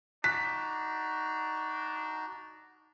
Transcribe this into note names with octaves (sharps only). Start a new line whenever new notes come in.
D4 D#4 F#4 F#6 B6